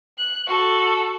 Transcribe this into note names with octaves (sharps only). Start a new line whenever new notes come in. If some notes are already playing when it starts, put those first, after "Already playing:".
F#6
F#4 A4